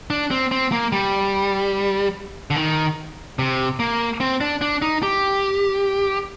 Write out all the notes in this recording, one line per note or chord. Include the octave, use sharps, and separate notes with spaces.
D4
C4
C4
A#3
G3
D3
D#3
C3
A#3
C4
D4
D4
D#4
G4